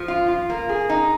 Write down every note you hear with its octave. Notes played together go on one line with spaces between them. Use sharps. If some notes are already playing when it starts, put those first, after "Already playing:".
Already playing: F3
F4
F4
A#3
G#4
D#4